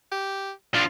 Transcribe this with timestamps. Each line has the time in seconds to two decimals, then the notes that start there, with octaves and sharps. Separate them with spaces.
0.12 G4
0.74 F3 D4 F4